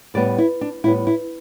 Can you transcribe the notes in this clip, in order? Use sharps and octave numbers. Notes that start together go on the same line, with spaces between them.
A2 G3 B3 D5
E4
D4
A2 G3 B3 E4
E4